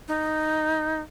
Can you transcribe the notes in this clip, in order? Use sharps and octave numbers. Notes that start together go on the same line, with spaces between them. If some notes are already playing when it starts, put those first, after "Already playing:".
D#4